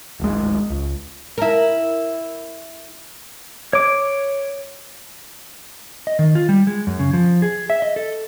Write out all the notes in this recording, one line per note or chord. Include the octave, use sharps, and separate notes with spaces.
D1 G#1 G#3
C#2
E4 A#4
C#5 D6
D#5
D#3
F4
G3
G#3
F#2
C#3
F3
G#4
E5
D#5
A4